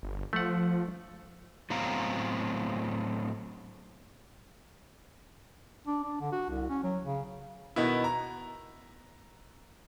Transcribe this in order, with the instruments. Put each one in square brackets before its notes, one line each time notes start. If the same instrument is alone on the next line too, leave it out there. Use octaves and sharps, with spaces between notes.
[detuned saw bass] G1
[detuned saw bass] F3 [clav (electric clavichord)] A3 F#5
[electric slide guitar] A2 F#3 B3 C4 F5 A#5
[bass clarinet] D4
D4
D3
F#4
C2
C#4
F#3
C#3
[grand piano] B2 D#3 B3 E4
A#5